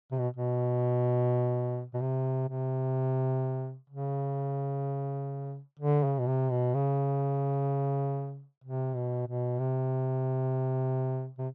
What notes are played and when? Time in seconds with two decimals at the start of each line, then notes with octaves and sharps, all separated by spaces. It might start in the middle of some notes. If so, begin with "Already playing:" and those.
0.11 C3
0.20 B2
0.36 B2
1.94 B2
2.01 C3
2.48 C3
3.90 C#3
5.79 D3
6.04 C#3
6.19 B2
6.27 C3
6.50 B2
6.75 C#3
8.64 C3
8.95 B2
9.27 B2
9.59 C3
11.38 C3